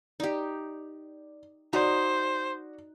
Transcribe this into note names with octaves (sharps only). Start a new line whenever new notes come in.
D#4 G4 D5
D#4 F#4 C5 D5